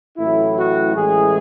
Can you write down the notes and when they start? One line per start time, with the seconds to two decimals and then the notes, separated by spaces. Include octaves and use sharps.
0.18 A1 A2 F#3 E4
0.57 F#4
0.96 A1 A2 E3 G#3 G#4